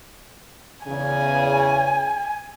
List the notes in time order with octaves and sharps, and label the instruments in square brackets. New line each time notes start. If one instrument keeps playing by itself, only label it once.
[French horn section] E2 C#3 [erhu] G#5